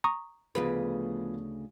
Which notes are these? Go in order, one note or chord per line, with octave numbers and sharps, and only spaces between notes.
A#5 C#6 D#6
D2 C#3 F3 B3 G#4 B4